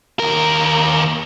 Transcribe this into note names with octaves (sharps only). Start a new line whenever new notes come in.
D#2 A#4